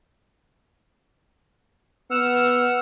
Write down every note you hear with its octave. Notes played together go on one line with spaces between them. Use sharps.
B3 F#5 E6 F6